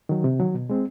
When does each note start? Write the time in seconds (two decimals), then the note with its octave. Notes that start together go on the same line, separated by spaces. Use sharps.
0.09 D#3 F#3
0.24 C3
0.39 D#3 F#3
0.54 B2
0.70 G#3 C4